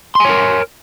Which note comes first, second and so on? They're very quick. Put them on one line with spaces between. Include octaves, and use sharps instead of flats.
C6 G#5 C#5 A#4